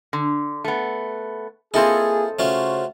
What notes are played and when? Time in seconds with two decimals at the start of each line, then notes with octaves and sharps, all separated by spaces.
0.13 D3
0.64 A3 B3
1.74 A#3 C4 E4 F4 G#4 A4 D#5
2.39 C#3 A3 C#4 F4 F#4 C5